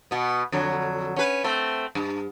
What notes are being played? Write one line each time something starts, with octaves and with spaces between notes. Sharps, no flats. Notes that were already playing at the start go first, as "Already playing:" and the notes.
B2 B3
F2 D3 F#3
C#4 B4
A3 C4
G2